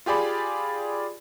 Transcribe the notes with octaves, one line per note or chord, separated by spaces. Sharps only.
F4 G4 G#4 D5 B5